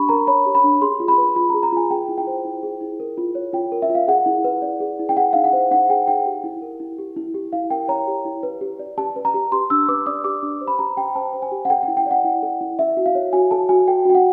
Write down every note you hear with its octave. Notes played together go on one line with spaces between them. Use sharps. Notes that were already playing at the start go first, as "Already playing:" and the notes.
Already playing: D4 G4 B5 C#6
A#4 A#5
C#5 B5
G4
B5
D4
G#4 C6
F4
B5
B4
F4 B5
A#5
G#4
A#5
F4 G#5
G#4 G5
E4
G5
C5
E4
G#4
E4
A#4
F4
C#5
F4 G5
A#4
E5
F4
F5
G#4 F#5
E4
B4
D5
G#4
E4
G5
G#4 F#5
D#4 F5
F#5
C5
D#4 F#5
G#4 G5
D#4 G5
G4
E4
A#4
E4
G4
E4
G4
E4 F5
A#4 G5
C#5 A#5
G4
E4
B4
G4
D5
G4 A5
B4
A#5
G4
G4 C6
D4 E6
B4 D6
D5 D#6
G4 D6
D4
C5
B5
G4 A#5
G4 G5
C5 A5
C5
G#5
G4
F#5
A4 G5
G5
E4
G5
D5 F#5
E4
A4
E4
A4 E5
F#4
F5
C#5
F#4 G#5
A4 A5
F#4 G#5
A4 G5
F#4 G5
F#5